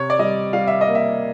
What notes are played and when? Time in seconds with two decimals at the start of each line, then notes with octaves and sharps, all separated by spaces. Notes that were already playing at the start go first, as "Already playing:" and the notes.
Already playing: C3 C#5
0.10 D5
0.19 G3 D#5
0.53 G3 F5
0.67 E5
0.81 D#5
0.88 A#3
0.95 E5